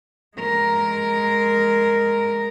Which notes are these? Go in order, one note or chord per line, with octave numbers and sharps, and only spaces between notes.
G#3 A#4